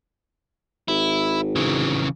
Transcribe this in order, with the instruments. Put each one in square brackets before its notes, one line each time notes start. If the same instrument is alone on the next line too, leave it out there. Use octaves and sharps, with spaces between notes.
[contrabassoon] G#1 [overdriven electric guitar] E4
[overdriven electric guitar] C#3 E3